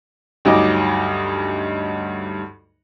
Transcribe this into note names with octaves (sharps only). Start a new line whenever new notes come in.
D2 G2 F#3 D#4 D#5 D6